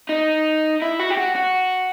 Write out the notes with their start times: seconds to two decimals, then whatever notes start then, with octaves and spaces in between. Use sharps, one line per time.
0.09 D#4
0.82 E4
0.99 F#4
1.10 G4
1.17 F#4
1.36 F#4